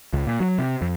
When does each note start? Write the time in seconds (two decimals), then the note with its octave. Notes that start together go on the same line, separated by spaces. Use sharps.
0.13 C#2
0.27 A#2
0.40 F#3
0.59 C3
0.82 F2